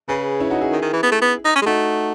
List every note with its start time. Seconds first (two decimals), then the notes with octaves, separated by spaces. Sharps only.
0.09 C#3 G#4 B4
0.40 C#4 E4
0.51 D#4 F#4
0.61 E4 G#4
0.72 D#3
0.82 D#3
0.93 E3
1.03 B3
1.12 A3
1.22 B3
1.45 D#4
1.56 C#4
1.62 G#3
1.66 A3 D#4 F#4